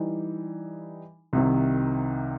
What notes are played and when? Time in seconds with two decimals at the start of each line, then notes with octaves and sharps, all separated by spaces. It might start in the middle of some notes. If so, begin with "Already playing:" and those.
Already playing: E3 G3 D#4
1.33 C2 C3 D#3